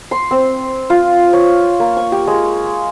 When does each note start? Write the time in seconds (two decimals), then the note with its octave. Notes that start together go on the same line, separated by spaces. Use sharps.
0.11 C6
0.31 C4
0.90 F4
1.33 C#5
1.80 A#3
1.97 C#6
2.12 G4
2.27 G#3